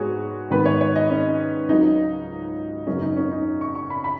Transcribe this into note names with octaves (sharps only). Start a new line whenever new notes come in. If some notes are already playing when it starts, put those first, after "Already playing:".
Already playing: G#2 G#3 B3 F#4 G#4 C#5
G#2 D#3 B3 B4
C#5
C#5
D#5
C#4
C#2 C#3 F#3 D#4
F#2 C#3 F#3 B3 C#4
D#4
C#4
D#4
C#6
C#6
B5
B5